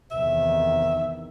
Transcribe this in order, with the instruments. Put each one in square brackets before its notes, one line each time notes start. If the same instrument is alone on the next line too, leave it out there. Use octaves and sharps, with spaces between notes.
[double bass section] E2 C3 D#3 [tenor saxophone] E5